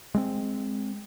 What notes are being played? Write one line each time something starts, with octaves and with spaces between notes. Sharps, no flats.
G#3 A3 C4